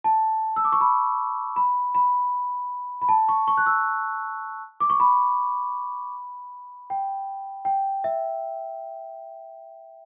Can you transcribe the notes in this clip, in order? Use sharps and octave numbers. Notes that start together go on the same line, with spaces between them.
A5
E6
D6
C#6
B5
B5
B5
B5
A5
C#6
C#6
F#6
E6
D6
C#6
B5
G5
G5
E5